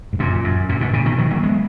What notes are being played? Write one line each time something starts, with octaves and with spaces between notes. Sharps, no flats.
G#2
F#2 A#2
F#2
F#2 A#2
G#2 B2
A#2 C#3
B2 D#3
D#3 F#3
F#3 A#3
G#3 B3